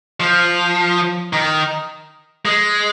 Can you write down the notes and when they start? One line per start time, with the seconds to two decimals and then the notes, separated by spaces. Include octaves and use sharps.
0.20 F3
1.33 D#3
2.45 G#3